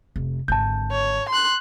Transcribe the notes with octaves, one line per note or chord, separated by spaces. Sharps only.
F1
G#1 D3 A5 G6
C#5
C6 F#6